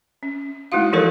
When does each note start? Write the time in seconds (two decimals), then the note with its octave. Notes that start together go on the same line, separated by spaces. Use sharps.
0.23 C#4
0.72 G#3 A3 D#4 E4 F#4 F5
0.93 E3 F3 G4 A4 A#4 C#5